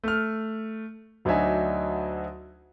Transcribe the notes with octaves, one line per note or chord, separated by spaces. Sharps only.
A3 F6
D2 F#3 D4 D#4 E5 G#5